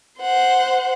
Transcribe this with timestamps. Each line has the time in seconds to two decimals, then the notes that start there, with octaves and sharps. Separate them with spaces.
0.19 C5 F#5